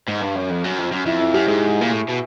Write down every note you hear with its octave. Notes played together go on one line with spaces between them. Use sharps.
G#2
G2
F#2
F2
F#2
F2
F#2
F2 E4
E4
F#2 G4
G#2 G#4
A#2
A2
B2